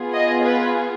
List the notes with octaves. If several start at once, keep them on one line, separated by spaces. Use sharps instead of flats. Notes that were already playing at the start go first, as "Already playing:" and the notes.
Already playing: B3 F4 G#4
D#5
B4